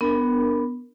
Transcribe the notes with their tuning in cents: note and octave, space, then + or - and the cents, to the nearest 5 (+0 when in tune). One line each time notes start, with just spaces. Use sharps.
B3 +0 D4 +5 A#4 +0